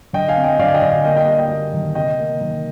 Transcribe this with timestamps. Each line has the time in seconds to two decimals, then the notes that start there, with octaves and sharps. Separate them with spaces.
0.13 D3 D#5 G5
0.28 F5 G#5
0.36 C4
0.44 D#5 G5
0.59 D3 D5 F5
0.69 G#5
0.74 D#5 G5
0.82 D3
0.90 F5 G#5
1.04 A#3 D#5 G5
1.17 D#5 G5
1.27 G3 D#5 G5
1.39 D#5 G5
1.51 A#3
1.73 D#3
1.95 C3 D#5 G5
2.18 A#3
2.41 D#3